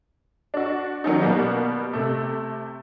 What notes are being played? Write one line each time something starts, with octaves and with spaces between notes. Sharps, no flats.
D4 F#4
D#3 F#3 C#4 D#4
B2 G3 A#3 B3
C3 A3